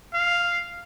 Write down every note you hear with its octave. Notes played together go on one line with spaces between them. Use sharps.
F5